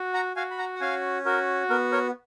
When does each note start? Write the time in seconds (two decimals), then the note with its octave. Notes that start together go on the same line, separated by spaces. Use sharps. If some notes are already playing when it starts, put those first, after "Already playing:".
Already playing: F#4
0.14 F#5 A#5
0.36 F#4 F5 G#5
0.51 B5
0.58 F#5 A#5
0.76 F#5
0.81 C#4 F5 G#5
1.25 F#4 A#4
1.70 B3 A#4
1.92 A#4 C#5